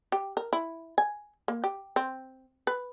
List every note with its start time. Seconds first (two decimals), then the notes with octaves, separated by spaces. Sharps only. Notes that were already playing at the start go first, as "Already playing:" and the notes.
0.12 G4
0.37 A#4
0.53 E4
0.98 G#5
1.48 A#3
1.64 G4
1.96 C4
2.67 B4